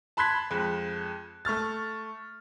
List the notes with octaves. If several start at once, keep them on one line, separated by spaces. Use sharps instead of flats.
A5 B5 C6 F#6 G#6 B6
F2 G#3
A3 C#6 F6 A6